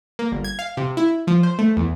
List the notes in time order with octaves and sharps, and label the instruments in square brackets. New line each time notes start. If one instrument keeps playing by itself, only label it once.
[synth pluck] A#3
G1
G#6
F5
C3
E4
F3
C5
A3
E2